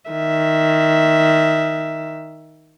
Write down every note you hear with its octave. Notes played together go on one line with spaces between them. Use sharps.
D#3 E5